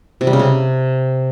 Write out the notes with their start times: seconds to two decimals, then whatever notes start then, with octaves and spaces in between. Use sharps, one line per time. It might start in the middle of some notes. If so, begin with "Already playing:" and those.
0.21 C3
0.27 G3
0.33 C#3
0.39 C3